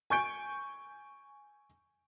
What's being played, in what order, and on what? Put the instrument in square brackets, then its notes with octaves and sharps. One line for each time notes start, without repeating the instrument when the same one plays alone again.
[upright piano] G#5 C#6 G6 D7